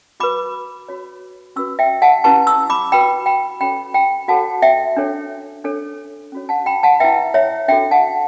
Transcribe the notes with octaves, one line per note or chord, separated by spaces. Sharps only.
F#4 B4 B5 D6
F#4 C#5
C#4 F#4 B4 C#6 E6
E5 G5
F#5 A5
C#4 E4 G4 B4 A5 C#6
C#6 E6
B5 D6
F#4 B4 G5 B5
G5 B5
C#4 F#4 A4 C#5 G5 B5
G5 B5
F#4 A4 C#5 F#5 A5
E5 G5
D4 A4 C#5
D4 A4 C#5
C#4 F#4 C#5
F#5 A5
G5 B5
F#5 A5
E4 B4 E5 G5
C#5 E5
D4 F#4 A4 E5 G5
F#5 A5